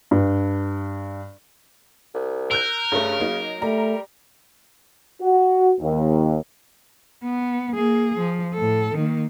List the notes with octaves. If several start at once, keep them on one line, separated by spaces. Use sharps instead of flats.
G2
C2
A#4 E6 F#6 G6
G2 C#3 A3
F#3 A#3 D#4
G3 A3 A#5
F#4
D#2
B3
A#3 G#4
F3
A2 A4
D#3 A#3